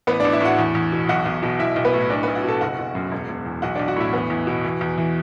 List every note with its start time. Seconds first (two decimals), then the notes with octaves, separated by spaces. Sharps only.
0.07 A1 B3 B4
0.20 A1 D4 D5
0.32 E4 E5
0.41 A2 F#4 F#5
0.59 E2
0.75 E2
0.92 B2
1.09 B1 F#4 F#5
1.26 B1
1.43 B2
1.59 B1 E4 E5
1.76 B1
1.85 B3 B4
1.94 A2
2.10 B1 D4 D5
2.23 B1 B3 B4
2.35 F#4 F#5
2.44 B2 A4 A5
2.61 F#1 F#4 F#5
2.78 F#1
2.95 F#2
3.12 E1
3.29 E1
3.46 E2
3.62 B1 F#4 F#5
3.75 B1 D4 D5
3.88 F#4 F#5
3.96 A2 E4 E5
4.13 E2 B3 B4
4.30 E2
4.47 B2
4.64 E3
4.81 E2
4.98 E3